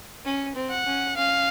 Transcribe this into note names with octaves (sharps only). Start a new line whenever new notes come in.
C#4
C4
F#5
C#4
C#4 F5